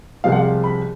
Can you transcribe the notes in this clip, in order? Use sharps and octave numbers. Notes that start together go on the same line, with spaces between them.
C2 C3 F3 G#3 F5
F#5
F5
B5